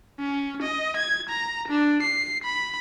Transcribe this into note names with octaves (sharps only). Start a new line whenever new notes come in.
C#4
D#5
G#6
A#5
D4
C7
B5